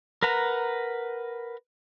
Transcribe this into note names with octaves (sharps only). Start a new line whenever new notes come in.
A#4 B4 F#5 A#5